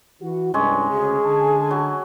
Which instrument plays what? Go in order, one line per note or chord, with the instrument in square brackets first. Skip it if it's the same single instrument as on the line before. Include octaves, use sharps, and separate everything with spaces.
[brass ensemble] E3 F#4
[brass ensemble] C2 G2 [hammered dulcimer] G#3 C#4
[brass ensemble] D2 C#3 [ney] G#4
[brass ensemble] D3 G#5 A5
[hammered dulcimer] F#3